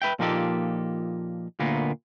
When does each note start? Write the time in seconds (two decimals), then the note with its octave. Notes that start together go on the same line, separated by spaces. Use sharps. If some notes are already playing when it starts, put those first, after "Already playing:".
0.02 B4 E5 G5
0.19 A#2 F3 A#3 D#4 G4 A4
1.60 D2 A#2 A#3 B3